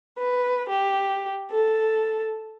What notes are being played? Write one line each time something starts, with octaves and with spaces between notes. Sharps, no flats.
B4
G4
A4